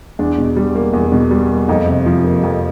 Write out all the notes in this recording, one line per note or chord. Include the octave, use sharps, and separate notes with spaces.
E2 D4
B2
G3
A#3
E2
B2
G3
A#3
F2 D#4
C3
F3
A#3
F2